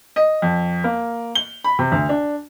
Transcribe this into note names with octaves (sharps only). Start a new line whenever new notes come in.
D#5
F2
A#3
G7
B5
C3
D2
D4